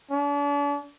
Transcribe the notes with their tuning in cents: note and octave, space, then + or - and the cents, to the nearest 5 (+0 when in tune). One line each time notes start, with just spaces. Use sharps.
D4 -40